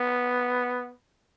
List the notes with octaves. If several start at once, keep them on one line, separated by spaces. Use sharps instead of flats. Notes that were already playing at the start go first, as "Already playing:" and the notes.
Already playing: B3